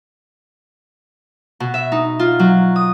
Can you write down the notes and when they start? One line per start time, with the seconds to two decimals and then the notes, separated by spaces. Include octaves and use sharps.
1.60 B2
1.74 E5
1.92 D#4
2.19 F4
2.39 F#3
2.76 D#6